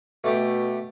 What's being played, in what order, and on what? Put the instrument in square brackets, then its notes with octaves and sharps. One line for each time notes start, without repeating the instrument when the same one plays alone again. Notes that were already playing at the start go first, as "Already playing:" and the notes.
[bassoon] B2 [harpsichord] A3 G4